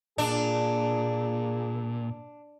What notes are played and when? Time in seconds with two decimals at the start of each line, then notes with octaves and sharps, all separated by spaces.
0.18 A#2 A#3 D4 F4 G#4